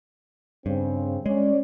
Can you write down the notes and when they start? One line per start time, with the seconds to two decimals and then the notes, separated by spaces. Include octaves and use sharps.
0.66 G2 C#3 C4 C#4
1.26 G#3 C#4 C#5 D5